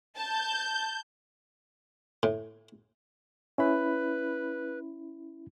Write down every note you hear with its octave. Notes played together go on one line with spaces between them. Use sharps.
A5 G6
A2
C#4 E4 B4 B5